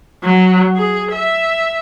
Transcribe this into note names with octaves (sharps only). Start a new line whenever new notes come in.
F#3
G#4
E5